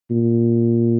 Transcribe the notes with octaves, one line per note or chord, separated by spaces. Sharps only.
A#2